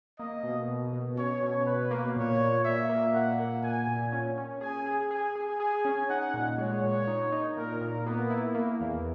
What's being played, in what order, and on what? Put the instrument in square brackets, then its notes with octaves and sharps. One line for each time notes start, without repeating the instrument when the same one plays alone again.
[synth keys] A#3 [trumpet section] D#5
[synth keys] B2
B2
B2
[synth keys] C#4 [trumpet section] C#5
[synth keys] B2
[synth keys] B2 [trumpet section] B4
[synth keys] A#3
[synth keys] A#2 [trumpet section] C#5
[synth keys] A#2
[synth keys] A#2 [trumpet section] E5
[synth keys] A#3
[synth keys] A#2 [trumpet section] F#5
[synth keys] A#3
[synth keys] A#2 [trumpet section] G#5
[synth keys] A#2
C#4
C#4
[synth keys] G#4 [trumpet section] G#5
[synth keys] G#4
[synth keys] G#4 [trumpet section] G#5
[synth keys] G#4
[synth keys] G#4 [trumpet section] G#5
[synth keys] C#4
[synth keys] D#4 [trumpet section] F#5
[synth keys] A#2
[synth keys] G#3 [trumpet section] C#5
[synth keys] A#2
D#4
D#4
[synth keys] A#2 [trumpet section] A#4
[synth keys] A#2
[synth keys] A#3 [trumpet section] B3
[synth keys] E4
A#3
E2